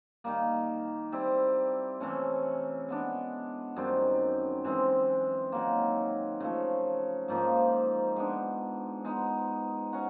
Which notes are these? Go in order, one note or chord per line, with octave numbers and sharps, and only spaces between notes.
D#3 G3 A#3
G3 C4 E4
C3 E3 A3 C#4
G#3 B3 D4
F#2 D#3 G3 C4
E3 G#3 C4
D#3 F#3 A#3
C#3 F3 A3
G#2 F3 A#3 D#4
G#3 B3 D4
G#3 B3 D#4
C#4 F#4